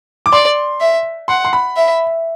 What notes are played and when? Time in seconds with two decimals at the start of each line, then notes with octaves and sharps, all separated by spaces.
0.26 D6
0.33 D5 C6
0.81 E5
1.28 F#5 C6
1.45 C6
1.53 B5
1.76 E5